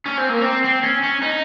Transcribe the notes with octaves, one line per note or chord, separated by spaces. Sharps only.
C#4
C4
A#3
C4
C4
C#4
C#4
D#4